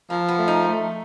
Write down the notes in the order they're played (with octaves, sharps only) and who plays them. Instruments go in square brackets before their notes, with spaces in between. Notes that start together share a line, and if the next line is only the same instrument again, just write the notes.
[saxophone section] F3 [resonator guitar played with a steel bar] A#3
[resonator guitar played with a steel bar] B3
[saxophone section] A3
[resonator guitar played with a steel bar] D#4
[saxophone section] A3